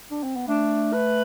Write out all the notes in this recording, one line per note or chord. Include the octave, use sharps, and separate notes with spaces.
D4
C4
B3
A3 D4
B4